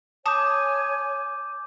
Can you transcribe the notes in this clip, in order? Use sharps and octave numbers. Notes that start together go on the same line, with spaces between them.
C#5 G#5 A5 D6 D#6 G6